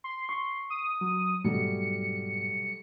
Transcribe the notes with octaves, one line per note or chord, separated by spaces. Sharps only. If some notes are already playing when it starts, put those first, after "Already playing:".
C6
C#6
D#6
F#3
G#2 B2 F#3 G3 A3 C#7